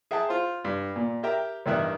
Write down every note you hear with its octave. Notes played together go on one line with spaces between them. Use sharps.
G#4 E5 F#5 G5 A5
F4 C5
G2
A#2
G4 A#4 E5 G5 A#5
A1 G2 D#3 E5 F#6